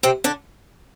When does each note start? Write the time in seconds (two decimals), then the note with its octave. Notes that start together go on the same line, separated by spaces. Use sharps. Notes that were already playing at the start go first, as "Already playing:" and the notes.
0.03 C3 C4
0.24 D3 D4